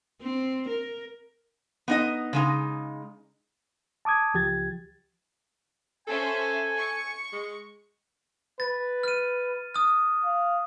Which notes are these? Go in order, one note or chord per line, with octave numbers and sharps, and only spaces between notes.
C4
A#4
B3 D#4 D#5
C#3 G#3 D#4
A5 D6 D#6 G#6
C#2 F3 G4 G#6 A6
C#4 A4 C5 E5 G#5
C#6 C#7
G#3
B4 A6
F6 D#7
D#6 F6
F5